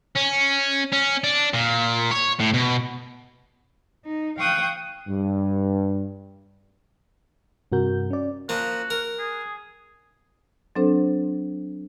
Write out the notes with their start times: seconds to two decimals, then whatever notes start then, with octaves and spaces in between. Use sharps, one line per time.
0.15 C#4
0.93 C#4
1.24 D4
1.54 A#2
2.11 C#5
2.40 A2
2.54 B2
4.05 D#4
4.39 F5 G5 C#6 D#6 F#6
5.07 G2
7.72 G2 C3 F#4 A#4 G6
8.11 C#4 D5
8.49 F3 A#3 F#4
8.90 A#4
9.19 G#4
10.76 F#3 C4 D4 A4 C5